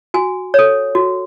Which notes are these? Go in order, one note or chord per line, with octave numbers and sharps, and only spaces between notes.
F#4 G#5
A4 C#5
F#4